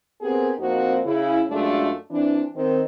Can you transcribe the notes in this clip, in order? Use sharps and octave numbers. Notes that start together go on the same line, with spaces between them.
B3 C4 G4 G#4 A#4
F2 A#3 C4 D#4 F#4
C#3 E4
F#2 G#3 A3 D4 F4
E3 C4 D4
D#3 C4